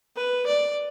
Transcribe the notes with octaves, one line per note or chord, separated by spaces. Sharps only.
B4
D5